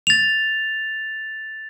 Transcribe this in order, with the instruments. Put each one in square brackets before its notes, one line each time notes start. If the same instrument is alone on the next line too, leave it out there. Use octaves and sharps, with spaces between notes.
[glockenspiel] A6 F7